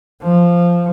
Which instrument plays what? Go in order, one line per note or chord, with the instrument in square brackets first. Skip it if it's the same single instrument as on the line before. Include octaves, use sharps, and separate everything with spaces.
[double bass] F3